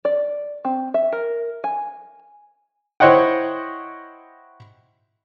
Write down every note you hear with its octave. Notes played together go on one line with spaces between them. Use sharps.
D5
C4
E5
A#4
G#5
E4 C5 C#5 D#5 F#5 G5